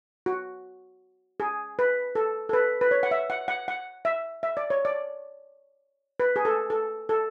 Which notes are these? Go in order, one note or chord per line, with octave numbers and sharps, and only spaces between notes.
F#4
G#4
B4
A4
A4
B4
B4
C#5
F#5
E5
F#5
F#5
F#5
E5
E5
D5
C#5
D5
B4
G#4
A4
A4
A4